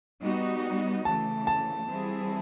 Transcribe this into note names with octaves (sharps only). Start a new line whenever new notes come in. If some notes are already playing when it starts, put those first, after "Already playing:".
G3 B3 D#4 F#4
C#3 E3 A3 A5
A5
E3 G3 C4 E4 G#4